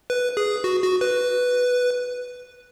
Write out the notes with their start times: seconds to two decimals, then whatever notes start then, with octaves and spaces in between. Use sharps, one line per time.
0.10 B4
0.37 G#4
0.64 F#4
0.83 F#4
1.01 B4